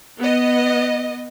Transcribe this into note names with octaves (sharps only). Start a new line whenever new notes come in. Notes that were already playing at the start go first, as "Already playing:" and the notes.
B3 D#5